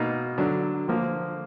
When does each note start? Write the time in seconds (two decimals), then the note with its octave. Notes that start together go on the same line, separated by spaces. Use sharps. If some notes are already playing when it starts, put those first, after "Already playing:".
Already playing: B2 A#3 D#4
0.38 D3 F#3 D4
0.88 D3 F3 A#3